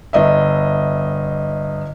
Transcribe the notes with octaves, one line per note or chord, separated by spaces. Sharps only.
G1 D#5 E5